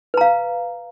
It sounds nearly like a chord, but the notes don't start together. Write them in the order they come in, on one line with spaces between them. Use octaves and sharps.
B4 A#5 F5